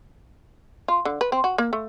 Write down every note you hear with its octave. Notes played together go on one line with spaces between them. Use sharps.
F4
D3
B4
C4
F#4
A#3
A3